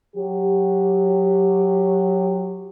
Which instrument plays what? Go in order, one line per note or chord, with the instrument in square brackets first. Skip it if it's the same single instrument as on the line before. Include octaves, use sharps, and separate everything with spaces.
[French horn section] F#3 G4